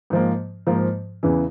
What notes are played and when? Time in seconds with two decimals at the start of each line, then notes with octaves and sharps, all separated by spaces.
0.10 G#2 F3 A#3
0.67 G#2 F3 A#3
1.23 E2 C#3 E3